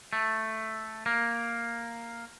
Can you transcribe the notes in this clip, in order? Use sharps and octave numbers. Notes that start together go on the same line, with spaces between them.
A3
A#3